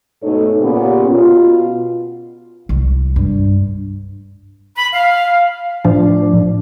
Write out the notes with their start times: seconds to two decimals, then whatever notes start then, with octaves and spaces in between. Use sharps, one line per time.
0.23 G#2 B2 A3 D#4 A4 C#5
0.62 A#2 C#3 B3 C#4 G4
1.09 B2 F4
2.69 C2
3.16 G2
4.76 B5
4.92 F5
5.85 A2 F3 D4